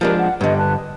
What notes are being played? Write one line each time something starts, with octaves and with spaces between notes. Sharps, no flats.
F3 G#3 D4 G4 A#4 B4
F#5
G2 D3 B4 D#5
B4 A5 F#6
D#6